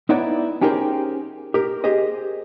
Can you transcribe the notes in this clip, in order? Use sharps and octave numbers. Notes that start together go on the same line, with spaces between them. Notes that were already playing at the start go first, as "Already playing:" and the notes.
B3 D#4 E4 B4 C#5 D5
C#4 D#4 G4 G#4 A#4 C5
G4 A#4
G4 G#4 C5 D#5